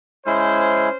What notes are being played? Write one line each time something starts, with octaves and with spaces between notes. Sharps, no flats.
G#3 C#4 E4 C5